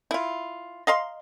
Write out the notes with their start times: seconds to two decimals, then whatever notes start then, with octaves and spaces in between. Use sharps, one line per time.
0.11 E4 F4
0.87 D#5 F5 A#5 C6